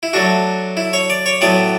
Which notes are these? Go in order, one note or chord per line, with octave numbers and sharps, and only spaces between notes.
E4
F#3 A3 D4 F#4
E4
C#5
D5
C#5
A2 F#3 B3 D5